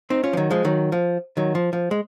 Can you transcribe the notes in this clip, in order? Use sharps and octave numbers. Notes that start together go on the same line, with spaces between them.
C4 D#4
C#4 F4
F3
D#3 F#3
F3 G#3
D#3 F#3
F3
D#3 F#3
F3
F3
G#3